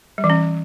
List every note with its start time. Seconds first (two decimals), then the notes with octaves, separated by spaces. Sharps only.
0.18 G3
0.24 E3
0.30 C#4